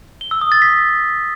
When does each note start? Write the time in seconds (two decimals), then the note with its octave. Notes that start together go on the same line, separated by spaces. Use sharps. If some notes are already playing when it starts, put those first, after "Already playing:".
0.21 G7
0.31 E6
0.41 D#6
0.52 A6
0.62 B6